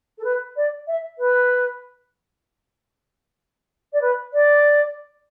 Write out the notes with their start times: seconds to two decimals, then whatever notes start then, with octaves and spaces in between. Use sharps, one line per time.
0.18 A4
0.24 B4
0.56 D5
0.87 E5
1.18 B4
3.92 D5
4.01 B4
4.33 D5